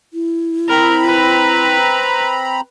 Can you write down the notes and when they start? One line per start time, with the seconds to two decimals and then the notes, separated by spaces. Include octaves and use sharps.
0.14 E4
0.69 C4 A#4 A#5 B5
1.06 B4